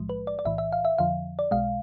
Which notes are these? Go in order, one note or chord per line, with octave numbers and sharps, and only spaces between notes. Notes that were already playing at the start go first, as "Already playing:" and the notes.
Already playing: B1 A2 F3 G#3
B4
D5
D5
B1 A2 E3 E5
E5
F5
E5
F2 D3 F3 F5
D5
B1 B2 G#3 F5